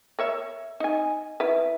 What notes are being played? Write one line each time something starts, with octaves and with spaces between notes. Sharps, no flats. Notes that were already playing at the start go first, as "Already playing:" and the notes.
A#4 C#5 E5
D#4 G#5
E4 B4